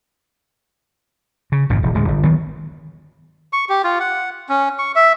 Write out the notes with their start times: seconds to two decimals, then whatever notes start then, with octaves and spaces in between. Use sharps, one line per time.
1.52 C#3
1.70 G#1 F2 A#2
1.83 E1
1.94 D1 E2 G#3
2.08 G1
2.23 D#3 E3 F#3 B3
3.53 C#6
3.69 G4
3.84 F4
4.00 F#5
4.49 C#4
4.79 C#6
4.96 E5